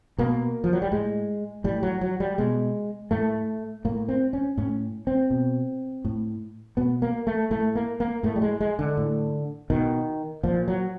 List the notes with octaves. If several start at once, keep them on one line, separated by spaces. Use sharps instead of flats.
B2 A#3
F3
F#3
G3
A2 G#3
A2 G3
F#3
F#3
G3
B2 G#3
A2 A3
A2 A#3
C4
C#4
A2 C#4
C4
B2
A2
B2 B3
A#3
A3
A2 A3
A#3
A#3
A2 A3
G3
G#3
G#3
D3
A2
B2 D#3
A#2 F3
F#3